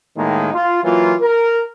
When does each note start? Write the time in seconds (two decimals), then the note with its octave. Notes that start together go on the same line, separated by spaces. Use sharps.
0.17 A2 D#3 G#3 A#3 D#4
0.54 F4
0.84 E3 F#3 A#3 F4
1.21 A#4